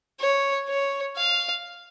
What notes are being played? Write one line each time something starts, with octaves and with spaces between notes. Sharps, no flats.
C#5
C#5
F5